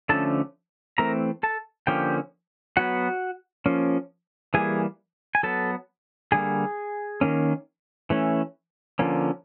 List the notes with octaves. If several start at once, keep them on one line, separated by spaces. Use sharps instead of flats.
D3 F3 A3 C#4 A4 A5
E3 A3 C4 A#4 A#5
A4 A5
D3 F3 A#3 C#4 G4 G5
F#3 B3 F#4 F#5
F3 A#3 C#4
E3 G3 A#3 G#4 G#5
G#5
F#3 B3 A4 A5
D3 G3 A#3 G#4 G#5
D#3 F#3 A#3 C#4
E3 A3 C#4
D3 F3 A#3 C#4